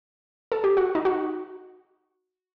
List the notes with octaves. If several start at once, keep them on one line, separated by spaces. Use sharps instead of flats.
A4
G4
F#4
D#4
F#4